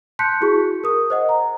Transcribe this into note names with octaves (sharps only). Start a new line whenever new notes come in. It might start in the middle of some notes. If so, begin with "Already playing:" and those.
A5 C6 F#6 G6 B6 C#7
E4 F#4 G#4 C#6
A#4 D#6
C5 D#5 F#5
A#5